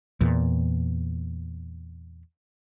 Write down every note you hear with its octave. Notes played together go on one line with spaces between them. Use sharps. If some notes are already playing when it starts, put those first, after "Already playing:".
E2 A#2